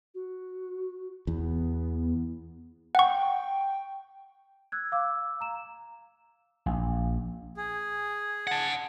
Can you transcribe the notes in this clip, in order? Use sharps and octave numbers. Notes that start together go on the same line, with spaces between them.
F#4
E2 B3
F#5 G5 C#6
E6 F#6 G#6
F5 D6 E6
A#5 E7
A#1
G#4
F#5 A5